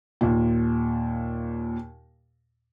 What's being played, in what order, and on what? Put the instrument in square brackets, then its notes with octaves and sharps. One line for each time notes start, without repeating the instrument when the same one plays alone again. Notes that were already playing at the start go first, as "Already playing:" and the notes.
[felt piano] D#2 A#2